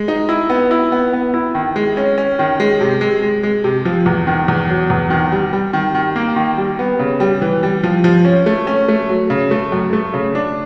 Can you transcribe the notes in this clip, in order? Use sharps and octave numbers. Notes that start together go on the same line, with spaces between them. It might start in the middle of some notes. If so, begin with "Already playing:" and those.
Already playing: G#3
D#4
E4
B3
E4
B3
B3
E4
D#3
G#3
C#4
C#4
D#3
G#3
C3
G#3
G#3
G#3
C3
F3
E2
D#3
E2
F#3
E2
D#3
G3
G3
D#3
D#3
A#3
D#3
G3
B3
C#3
G3
E3
G3
F3
F3
C#4
A3
C#4
A3
F#3
C#3
A3
F#2
A3
C#3
D4